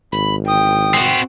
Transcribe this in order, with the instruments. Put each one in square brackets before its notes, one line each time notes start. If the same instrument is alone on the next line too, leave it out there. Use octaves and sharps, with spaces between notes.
[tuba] G#1 [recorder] B5
[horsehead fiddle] G5 [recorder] D#6
[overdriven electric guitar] C4 F#4